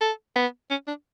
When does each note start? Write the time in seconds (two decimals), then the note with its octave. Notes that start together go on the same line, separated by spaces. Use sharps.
0.01 A4
0.36 B3
0.70 C#4
0.88 D4